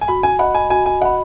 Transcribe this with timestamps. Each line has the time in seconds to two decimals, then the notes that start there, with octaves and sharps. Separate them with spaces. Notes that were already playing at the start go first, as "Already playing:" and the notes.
0.01 G#5
0.08 F#4 B5
0.23 G#5
0.39 D#5 F#5 B5
0.55 G#5
0.70 F#4 G#5
0.86 G#5
1.01 D#5 F#5 B5